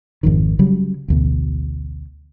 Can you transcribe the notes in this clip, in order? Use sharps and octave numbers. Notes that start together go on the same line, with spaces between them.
G#1 F2 D#3
C#3 F#3 G3
A1 D2 B2